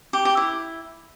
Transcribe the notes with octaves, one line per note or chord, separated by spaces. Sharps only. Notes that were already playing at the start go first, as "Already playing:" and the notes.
G4
G4
E4